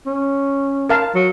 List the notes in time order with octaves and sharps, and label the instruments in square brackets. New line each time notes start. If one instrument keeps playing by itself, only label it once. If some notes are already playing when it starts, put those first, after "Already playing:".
[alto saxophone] C#4
[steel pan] A#4 F5 A5
[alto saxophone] F#3